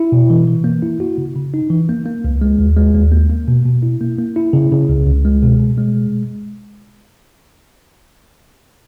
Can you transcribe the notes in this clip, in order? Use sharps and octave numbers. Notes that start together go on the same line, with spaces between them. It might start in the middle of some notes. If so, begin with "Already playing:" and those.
Already playing: E4
B2
E3
E3
A#3
E4
F#4
C#3
C#3
D#4
E3
A#3
A#3
C#2
G#3
D#2
G#3
D#2
A#3
A#3
B2
B2
E4
A#3
A#3
E4
C#3
C#3
C#2
C#2
G#3
B2
B2
G#3